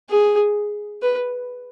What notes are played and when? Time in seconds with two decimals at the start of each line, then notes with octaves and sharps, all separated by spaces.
0.10 G#4
1.02 B4